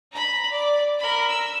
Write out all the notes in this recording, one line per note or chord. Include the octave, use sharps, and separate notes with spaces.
A#5 B5
D5
A#4 B5
E6